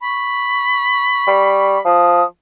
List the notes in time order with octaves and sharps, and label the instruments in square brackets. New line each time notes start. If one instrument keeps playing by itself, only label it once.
[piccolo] B5 [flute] C#6
[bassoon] G3
[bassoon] F3 [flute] D#6